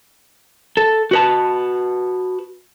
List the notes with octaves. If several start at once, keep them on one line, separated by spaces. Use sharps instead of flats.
A4
F#4 B4 A5